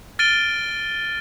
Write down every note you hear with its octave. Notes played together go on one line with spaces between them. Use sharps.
F6 A6 D7 D#7 G7